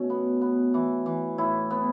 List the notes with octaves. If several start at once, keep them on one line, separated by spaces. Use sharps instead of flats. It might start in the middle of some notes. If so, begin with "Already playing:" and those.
Already playing: B2 A3 C#4
B3
B3
E3
E3
A2 E4
B3